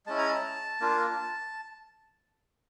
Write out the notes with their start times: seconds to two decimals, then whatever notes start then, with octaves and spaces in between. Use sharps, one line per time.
0.06 G#3 C#4 E4 A5
0.18 A#5
0.29 A5
0.80 A#3 D4 F4